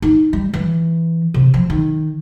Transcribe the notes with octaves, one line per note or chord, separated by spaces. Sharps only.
D#4
G3
E3
C3
F3
D#3